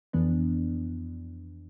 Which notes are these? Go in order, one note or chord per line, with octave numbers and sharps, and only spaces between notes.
F2 E3 B3 D4